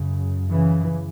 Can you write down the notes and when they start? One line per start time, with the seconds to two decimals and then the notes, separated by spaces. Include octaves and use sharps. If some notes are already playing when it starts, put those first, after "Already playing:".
Already playing: F#2 C#3
0.51 C#3 E3